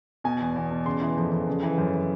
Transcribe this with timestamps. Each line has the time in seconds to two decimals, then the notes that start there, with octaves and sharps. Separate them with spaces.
0.24 B2 G#5
0.40 E2
0.56 E2
0.71 B2
0.86 C#3 C6
1.01 E3
1.17 F2
1.32 F2
1.47 C#3
1.63 E3
1.78 F#2